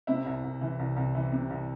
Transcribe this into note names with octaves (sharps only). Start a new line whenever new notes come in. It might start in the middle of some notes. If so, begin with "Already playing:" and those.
C3 E4
C2
C2
E3
C2
C2
E3
C3
C2